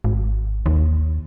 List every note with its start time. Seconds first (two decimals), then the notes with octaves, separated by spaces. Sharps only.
0.04 G#1
0.66 D#2